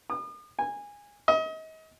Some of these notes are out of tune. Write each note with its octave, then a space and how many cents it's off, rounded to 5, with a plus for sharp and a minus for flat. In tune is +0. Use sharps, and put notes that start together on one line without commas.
D#6 -45
G#5 -20
D#5 +35